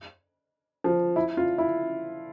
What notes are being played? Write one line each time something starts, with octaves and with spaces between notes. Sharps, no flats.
F3
E4
F4
E4